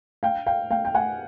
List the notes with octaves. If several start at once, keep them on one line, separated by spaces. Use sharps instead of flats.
F5 G5
F5 G5
F5 G5
G5
F#5 G#5